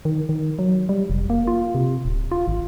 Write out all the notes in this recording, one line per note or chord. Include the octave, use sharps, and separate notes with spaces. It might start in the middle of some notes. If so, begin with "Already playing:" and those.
D#3
D#3
F#3
G3
F1
A#3
F4
C3
D1
F4
G#1